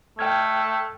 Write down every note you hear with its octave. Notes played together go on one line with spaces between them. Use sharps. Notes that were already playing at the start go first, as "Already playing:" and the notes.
A3 G5 F6 G#6